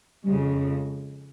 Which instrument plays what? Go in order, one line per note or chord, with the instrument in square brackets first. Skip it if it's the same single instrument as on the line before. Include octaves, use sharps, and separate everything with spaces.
[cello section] F2 C#3 G#3 [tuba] G3